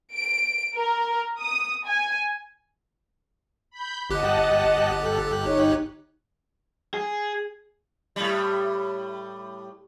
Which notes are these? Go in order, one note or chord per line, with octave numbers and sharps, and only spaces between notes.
D7
A#4
D#6
G#5
B5 G6
G1 G4 D#5 F#5 A5 F#6
A4
D#4 C#5
G#4
A2 G3